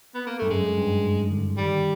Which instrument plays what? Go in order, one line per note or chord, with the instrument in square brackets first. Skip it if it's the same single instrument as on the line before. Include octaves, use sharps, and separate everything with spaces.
[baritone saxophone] B3
A#3
[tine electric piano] G2 [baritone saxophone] A3
[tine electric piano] F#2 [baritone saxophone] G#3
[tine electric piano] G2
G#2
D3
[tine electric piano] D#3 [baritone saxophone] G3